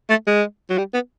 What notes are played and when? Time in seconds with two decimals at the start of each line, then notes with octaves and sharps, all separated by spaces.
0.09 A3
0.27 G#3
0.70 F#3
0.78 G3
0.94 B3